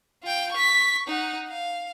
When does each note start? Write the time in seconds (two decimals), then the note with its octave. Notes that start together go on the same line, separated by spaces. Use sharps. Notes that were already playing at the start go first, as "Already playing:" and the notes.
0.23 F4 G5
0.52 C#6 B6
1.08 D#4 F#5
1.49 F5